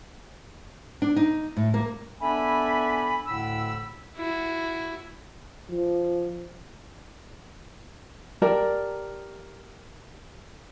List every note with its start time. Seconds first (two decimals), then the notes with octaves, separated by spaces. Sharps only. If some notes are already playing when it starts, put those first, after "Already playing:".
1.02 D4
1.16 D#4
1.56 A2
1.74 A#3
2.21 B3 D4 A4 E5 G#5 B5
3.26 D2 A2 D3 B5 E6
4.16 E4 F#4
5.71 F3
8.42 G4 A#4 D5 A5